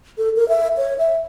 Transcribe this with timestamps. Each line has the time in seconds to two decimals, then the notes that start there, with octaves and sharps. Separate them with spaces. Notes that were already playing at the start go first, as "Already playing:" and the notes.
0.18 A4
0.36 A#4
0.49 E5
0.77 C#5
0.98 E5